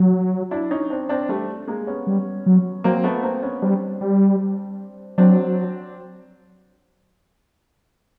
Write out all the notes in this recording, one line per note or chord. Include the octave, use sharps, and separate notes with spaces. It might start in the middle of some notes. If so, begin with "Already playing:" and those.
Already playing: F#3
D4 E4
C#4 D#4
C4 D4
C4 D4
G3 A3
G#3 A#3
B3 C#4
G3
F#3
F#3 A#3 C4
A3 B3
A#3 C4
B3 C#4
G3 C4 D4
G3
F#3 C4 D4